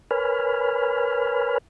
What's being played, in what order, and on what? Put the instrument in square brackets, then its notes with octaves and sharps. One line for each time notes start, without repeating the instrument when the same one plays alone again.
[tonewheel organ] A#4 B4 C#5 G#5 B5 F6